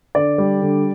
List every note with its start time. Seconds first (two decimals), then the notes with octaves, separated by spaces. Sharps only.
0.15 D3 D5
0.38 G3
0.61 D3